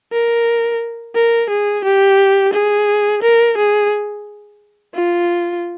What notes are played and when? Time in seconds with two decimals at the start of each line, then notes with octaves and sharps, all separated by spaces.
0.12 A#4
1.15 A#4
1.50 G#4
1.84 G4
2.53 G#4
3.23 A#4
3.58 G#4
4.94 F4